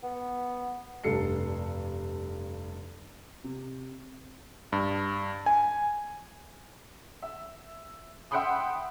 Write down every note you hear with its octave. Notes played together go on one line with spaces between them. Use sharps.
B3
F1 G2 A4 C7 C#7
C3
G2
G#5
E5
E5 F#5 G5 B5 C6 D#6